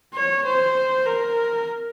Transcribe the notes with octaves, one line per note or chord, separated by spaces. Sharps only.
C#5
C5
A#4